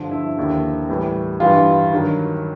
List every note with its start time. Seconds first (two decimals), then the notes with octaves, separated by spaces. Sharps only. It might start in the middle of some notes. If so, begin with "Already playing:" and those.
Already playing: G2 D3 F3
0.11 E4
0.37 D#2 D3 F3
0.89 A2 E3 G3
1.40 G2 E3 G3 F4
1.92 G2 D#3 F#3